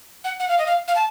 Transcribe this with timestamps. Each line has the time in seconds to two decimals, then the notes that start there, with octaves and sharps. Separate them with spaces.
0.24 F#5
0.40 F#5
0.49 F5
0.59 D#5
0.66 F5
0.88 F5
0.95 A5